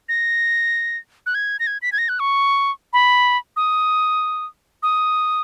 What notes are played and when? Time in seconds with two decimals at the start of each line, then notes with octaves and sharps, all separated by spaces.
0.09 A#6
1.26 F#6
1.35 G#6
1.60 A#6
1.67 G#6
1.82 B6
1.92 G#6
1.98 A#6
2.09 F#6
2.20 C#6
2.93 B5
3.56 D#6
4.83 D#6